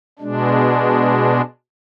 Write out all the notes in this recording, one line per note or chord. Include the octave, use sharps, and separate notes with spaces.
B2 G#3 D4